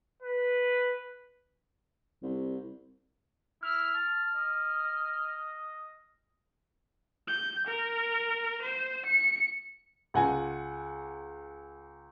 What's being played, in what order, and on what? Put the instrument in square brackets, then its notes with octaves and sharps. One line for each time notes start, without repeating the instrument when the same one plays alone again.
[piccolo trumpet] B4
[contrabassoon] C2
[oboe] E4 [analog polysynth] F6
[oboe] A5
D#5
[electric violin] G6
A#4
C5
C#7
[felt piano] C#2 F#5 G#5